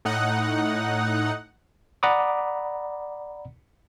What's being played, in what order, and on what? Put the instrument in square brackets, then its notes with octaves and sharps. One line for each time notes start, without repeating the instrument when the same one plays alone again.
[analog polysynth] A2 D#4 F#5
[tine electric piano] D5 F#5 A#5 B5 D6 D#6